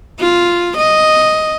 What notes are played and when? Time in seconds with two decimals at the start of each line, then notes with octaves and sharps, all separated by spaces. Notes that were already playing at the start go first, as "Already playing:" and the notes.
0.20 F4
0.77 D#5